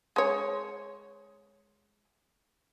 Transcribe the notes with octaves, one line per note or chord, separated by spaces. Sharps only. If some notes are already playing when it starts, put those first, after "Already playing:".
G#3 C#5